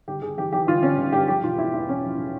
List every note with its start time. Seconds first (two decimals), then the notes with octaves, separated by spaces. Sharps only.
0.08 G1 G4
0.22 G1 G#4
0.37 E3 G4
0.52 E3 G4
0.67 G1 F4
0.82 G1 C#4
0.98 G1
1.12 G2 G4
1.28 F3 G4
1.43 E1 F4
1.58 E2 E4
1.74 E2 E4
1.88 E1 C#4
2.03 F3 E4
2.18 C#3